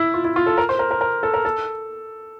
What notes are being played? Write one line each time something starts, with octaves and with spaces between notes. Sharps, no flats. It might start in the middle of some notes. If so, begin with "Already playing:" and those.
Already playing: E4
F4
E4
F4
A4
A#4
C5
A#4
A#4
A#4
A4
A#4
A4